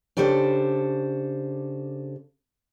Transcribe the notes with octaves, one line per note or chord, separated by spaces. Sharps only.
C#3 D4 G4 A4 C5